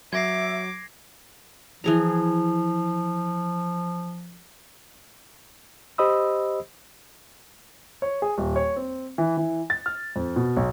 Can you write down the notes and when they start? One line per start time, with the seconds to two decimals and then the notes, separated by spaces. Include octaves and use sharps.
0.13 F#3 E5 D6 G#6 A#6 C7
1.84 E3 F3 G#4 A#5
5.98 G4 C5 D#5 B5 D#6 E6
8.02 C#5
8.22 G#4
8.38 D#1
8.56 C#5
8.76 C4
9.18 E3
9.37 E3
9.70 A6
9.86 F6
10.16 F2
10.36 B2
10.57 B1